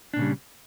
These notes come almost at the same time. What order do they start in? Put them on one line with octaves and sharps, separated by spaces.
D4 A#2 C#3 G3